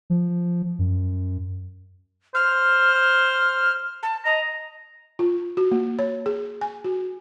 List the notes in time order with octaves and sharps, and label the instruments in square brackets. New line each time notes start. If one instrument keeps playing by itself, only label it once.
[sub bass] F3
F#2
[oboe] C5 [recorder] F6
[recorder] A5
[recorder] D#5 [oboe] A#5
[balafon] F4
F#4
A#3
C#5
G#4
G#5
F#4